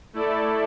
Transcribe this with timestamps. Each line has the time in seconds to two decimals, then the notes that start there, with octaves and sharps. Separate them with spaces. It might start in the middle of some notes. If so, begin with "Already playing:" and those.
0.13 A3 E4 A4 D5